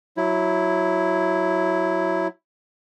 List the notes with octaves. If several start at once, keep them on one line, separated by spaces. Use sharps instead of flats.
F#3 E4